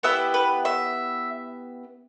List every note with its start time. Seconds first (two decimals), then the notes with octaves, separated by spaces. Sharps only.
0.03 B3 E4 G4 E5
0.34 B4
0.65 E5